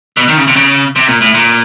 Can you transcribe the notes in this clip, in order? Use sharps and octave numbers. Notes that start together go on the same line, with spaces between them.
B2
D#3
C#3
C3
C#3
C3
A#2
A2
A#2